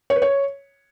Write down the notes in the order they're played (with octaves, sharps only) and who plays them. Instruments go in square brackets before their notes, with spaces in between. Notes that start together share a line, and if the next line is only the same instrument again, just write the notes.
[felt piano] C#5
B4
C#5